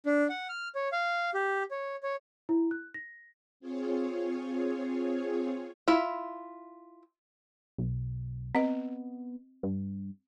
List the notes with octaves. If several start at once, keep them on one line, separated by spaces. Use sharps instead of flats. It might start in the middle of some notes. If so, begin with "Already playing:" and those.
D4
F#5
F6
C#5
F5
G4
C#5
C#5
E4
F#6
A#6
C4 F4 G#4 C#5
E4 F4 E5
B1
B3 C4 D#5
G2